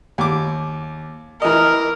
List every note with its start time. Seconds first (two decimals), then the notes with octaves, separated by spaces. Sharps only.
0.18 D#2 D6
1.42 E3 A#4 D#5